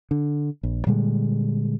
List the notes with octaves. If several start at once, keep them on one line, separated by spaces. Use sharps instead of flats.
D3
A#1
A#2 D3 G3 G#3